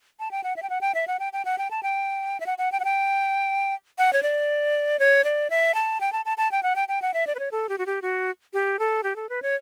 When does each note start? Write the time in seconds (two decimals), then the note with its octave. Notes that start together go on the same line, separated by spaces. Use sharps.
0.20 A5
0.31 G5
0.44 F#5
0.56 E5
0.63 G5
0.70 F#5
0.81 G5
0.95 E5
1.08 F#5
1.19 G5
1.33 G5
1.45 F#5
1.58 G5
1.71 A5
1.83 G5
2.40 E5
2.46 F#5
2.58 F#5
2.72 G5
2.80 F#5
2.85 G5
3.98 F#5
4.13 C#5
4.23 D5
4.99 C#5
5.24 D5
5.50 E5
5.74 A5
6.01 G5
6.12 A5
6.25 A5
6.38 A5
6.51 G5
6.63 F#5
6.76 G5
6.88 G5
7.02 F#5
7.14 E5
7.27 D5
7.35 B4
7.39 C#5
7.51 A4
7.69 G4
7.78 F#4
7.86 G4
8.02 F#4
8.53 G4
8.79 A4
9.03 G4
9.16 A4
9.29 B4
9.42 C#5